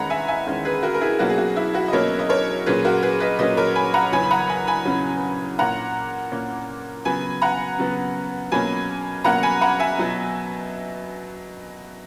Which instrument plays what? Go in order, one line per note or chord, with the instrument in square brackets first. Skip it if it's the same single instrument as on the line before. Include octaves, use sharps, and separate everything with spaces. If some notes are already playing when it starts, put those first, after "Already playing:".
Already playing: [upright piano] E2 D#3 G#3 C#4 F#5 A#5 B5
E5 G#5
E5 G#5
E2 D#3 G#3 C#4
G#4 B4
F#4 A#4
A#4
E4 G#4
B2 F#3 A#3 C#4 F#4
G#4
F#4
E4
F#4
D#5
B2 F#3 A#3 C#4 A#4 C#5
D#5
A#4 C#5
A#2 F#3 C#4 G#4 B4
F#4 A#4
G#4 B4
B4 D#5
A#2 F#3 C#4 B4 D#5
A#4 C#5
G#5 B5
F#5 A#5
E2 C#3 F#3 C#4 G#5 B5
B5
F#5 A#5
G#5 B5
G#5 B5
E2 C#3 F#3 C#4
A#2 A#3 C#4 F#5 A#5
A#2 A#3 C#4
C#3 F#3 B3 G#5 B5
F#5 A#5
C#3 F#3 B3
B2 F#3 A#3 C#4 G#5 B5
B2 F#3 A#3 C#4 F#5 A#5
G#5 B5
F#5 A#5
E5 G#5
B2 F#3 B3